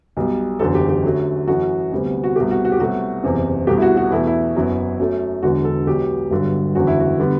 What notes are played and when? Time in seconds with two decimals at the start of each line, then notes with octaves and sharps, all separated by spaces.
0.17 B1 B2 G3
0.59 F#1 E2 D3 F#3 A4
0.75 G4
0.89 G4
1.03 F#2 D3 F#3 A3
1.47 F#2 E3 A3 F#4
1.92 D2 C3 G3 B3
2.24 F#4
2.36 C2 B2 A3 G4
2.51 F#4
2.65 F#4
2.72 G4
2.79 C2 B2 F#3 A3 F#4
3.24 F#1 E2 C3
3.67 C2 B2 A3 G4
3.77 E4
3.82 F#4
3.97 F#4
4.11 E2 B2 A3 E4
4.27 E4
4.56 F#1 F#2 F#3 B3
4.99 F#2 F#3 A3
5.42 E1 E2 D3 F#3 F#4
5.64 A4
5.87 B1 B2 F#3 B3 G4
6.31 G1 G2 D3 F#3
6.75 F#1 E2 D3 F#3 F#4
6.87 E4
7.00 F#4
7.20 D3 G3 B3